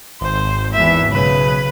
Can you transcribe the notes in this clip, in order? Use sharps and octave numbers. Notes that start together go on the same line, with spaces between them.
G#1 C5
E2 E3 E5
B1 C#3 B4